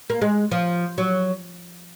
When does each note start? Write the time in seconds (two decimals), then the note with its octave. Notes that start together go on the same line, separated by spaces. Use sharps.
0.10 A#3
0.21 G#3
0.51 F3
0.98 F#3